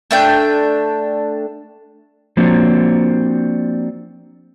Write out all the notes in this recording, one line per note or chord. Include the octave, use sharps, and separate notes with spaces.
A3 D4 G5
F3 A#3 C4 D4 F#4